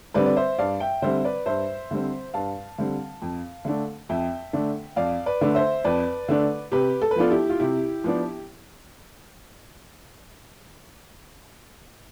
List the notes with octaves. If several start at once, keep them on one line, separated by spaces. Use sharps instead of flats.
D3 G3 C4 B4 D5
D5
C5 E5
G2 D5 F5
E5 G5
D3 G3 C4 C5 E5
B4 D5
G2 C5 E5
D3 G3 C4
G2 F5 A5
D3 G3 C4
F2
D3 A3 D4
F2 E5 G5
D3 A3 D4
F2 D5 F5
B4 D5
D3 A3 D4
C5 E5
F2 B4 D5
D3 A3 D4
C3 G4 B4
A4
B4
F3 B3 D4 F4 A4
E4 G4
F4
C3 E4 G4
F3 B3 D4